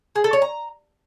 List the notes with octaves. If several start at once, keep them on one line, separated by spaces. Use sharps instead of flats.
G#4
A4
C#5
A#5